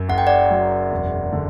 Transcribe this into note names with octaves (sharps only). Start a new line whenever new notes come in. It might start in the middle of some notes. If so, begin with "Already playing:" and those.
Already playing: F#2 F#3
F#1 F#5
G5
D5 F#5
F#3
E1
D3